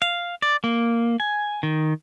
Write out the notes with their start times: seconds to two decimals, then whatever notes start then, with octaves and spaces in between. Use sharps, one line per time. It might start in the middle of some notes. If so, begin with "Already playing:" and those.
0.02 F5
0.42 D5
0.64 A#3
1.20 G#5
1.63 D#3